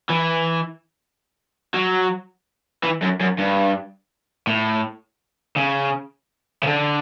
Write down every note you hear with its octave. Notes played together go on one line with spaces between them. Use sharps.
E3
F#3
E3
F#2
F#2
G2
A2
C#3
C#3
D3